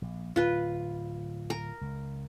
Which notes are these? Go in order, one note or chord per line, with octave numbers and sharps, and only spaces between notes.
A#1
D1 F4 B4
A#4
C#2